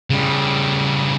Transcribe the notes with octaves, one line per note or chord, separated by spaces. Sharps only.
C#3 G3